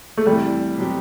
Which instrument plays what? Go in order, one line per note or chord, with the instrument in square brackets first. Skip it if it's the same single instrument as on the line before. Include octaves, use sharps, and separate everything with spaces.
[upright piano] A3
[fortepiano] E2 C3 E3 [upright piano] G3
[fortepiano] B2 F#3 C4 G4